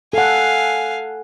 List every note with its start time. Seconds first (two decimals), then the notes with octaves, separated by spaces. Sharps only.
0.13 A4 F5 F#5 G#5